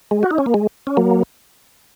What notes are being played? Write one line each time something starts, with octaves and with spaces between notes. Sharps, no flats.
G#3
F#4
D#4
C#4
A#3
G#3
C#4
F#3 A#3